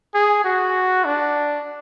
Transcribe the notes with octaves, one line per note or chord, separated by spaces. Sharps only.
G#4
F#4
D4